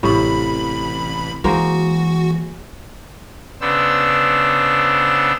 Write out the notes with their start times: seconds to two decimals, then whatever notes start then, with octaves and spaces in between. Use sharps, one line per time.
0.03 A1 A2 C3 B5
1.44 E3 G#3 A#3 F#4 C5
3.61 C#3 B3 D4 C5 E6